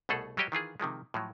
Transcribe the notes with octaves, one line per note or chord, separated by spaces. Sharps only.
C2 B2 A3 G#4 A4 F#5
F#3 G3 F#4 G4 C#5 D#5
D#3 E3 F4 G#4
C3 D#3 F3 G#3
A2 F3 F#3